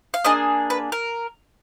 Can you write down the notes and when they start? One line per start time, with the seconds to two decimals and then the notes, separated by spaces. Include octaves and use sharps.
0.14 F5
0.24 A#3 D4 G#4 D#5
0.70 B4
0.92 A#4